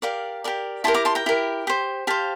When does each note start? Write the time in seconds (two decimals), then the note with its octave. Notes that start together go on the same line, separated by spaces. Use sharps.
0.02 G4 A#4 D5 F5
0.44 G4 A#4 D5
0.84 E4 G4 A#4 A5 C6
0.94 A#5 D6
1.05 A5 C6
1.15 G5 A#5
1.26 E4 G4 A#4
1.67 G4 C5
2.07 G4 C5 F5 A5